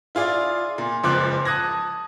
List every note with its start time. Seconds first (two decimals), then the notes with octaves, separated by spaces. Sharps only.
0.15 E4 F4 G#4 D5 F5
0.78 A#2
1.03 F#1 C#2 F3 D6 F#6
1.45 A5 D#6 F#6 G#6 A#6